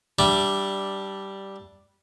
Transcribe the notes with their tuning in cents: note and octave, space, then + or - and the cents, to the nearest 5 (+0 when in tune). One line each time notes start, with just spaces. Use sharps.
G3 -5 D4 +0 E5 +15